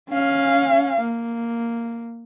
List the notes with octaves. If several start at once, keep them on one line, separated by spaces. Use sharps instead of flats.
C#4 F5
A#3